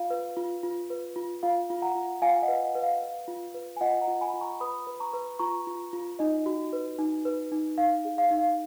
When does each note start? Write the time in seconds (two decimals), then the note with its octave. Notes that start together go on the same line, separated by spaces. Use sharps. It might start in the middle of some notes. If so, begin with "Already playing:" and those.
Already playing: F4 F5
0.10 B4
0.37 F4
0.63 F4
0.90 B4
1.16 F4
1.43 F4 F5
1.70 F4
1.82 F#5 A#5
1.95 F4
2.22 F4 F5 G#5
2.42 D#5 F#5
2.48 B4
2.62 D#5
2.75 B4
2.82 F5
3.02 B4
3.28 F4
3.54 B4
3.77 G#5
3.81 F4 D#5 F#5
4.01 F#5 A#5
4.08 F4
4.21 G#5 B5
4.33 F4
4.41 A#5 C#6
4.60 B4 B5 D#6
4.87 B4
5.00 A#5 C#6
5.13 B4
5.39 F4 A#5 C#6
5.67 F4
5.93 F4
6.19 D#4 D#5
6.46 F#4
6.73 B4
6.99 D#4
7.25 B4
7.52 D#4
7.78 D#4 F5
8.05 G#4
8.18 F5
8.31 D#4
8.38 F5